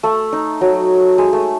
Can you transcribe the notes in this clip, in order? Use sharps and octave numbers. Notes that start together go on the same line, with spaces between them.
A3
D#4
F#3
G#3
A3